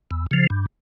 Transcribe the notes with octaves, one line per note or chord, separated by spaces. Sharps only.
E2
C#3 F3
G2